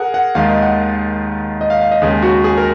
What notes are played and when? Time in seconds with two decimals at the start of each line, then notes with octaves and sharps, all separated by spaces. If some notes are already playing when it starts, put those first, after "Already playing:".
Already playing: G#4 A#4 F#5
0.14 F#5
0.35 D#2 D#3 G#3 F5
0.49 D#5
0.63 F#5
1.61 D#5
1.70 F5
1.81 F5
1.91 D#5
2.02 D#2 C#3 G#3 G#4
2.22 F#4
2.44 G#4
2.57 A#4